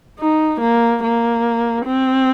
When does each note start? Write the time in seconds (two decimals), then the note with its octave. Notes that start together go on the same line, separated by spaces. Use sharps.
0.19 D#4
0.61 A#3
1.03 A#3
1.85 C4